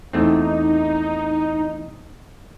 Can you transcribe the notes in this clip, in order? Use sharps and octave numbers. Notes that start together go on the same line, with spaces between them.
E2 A3 C4 D#4